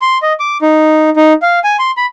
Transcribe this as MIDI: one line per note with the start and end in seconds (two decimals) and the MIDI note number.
0.02 0.18 84
0.22 0.33 75
0.40 0.58 86
0.62 1.10 63
1.16 1.33 63
1.42 1.59 77
1.64 1.77 80
1.79 1.91 84
1.97 2.06 83